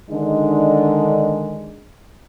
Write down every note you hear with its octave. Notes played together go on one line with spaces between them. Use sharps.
D3 D#3 G#3 D4 D#4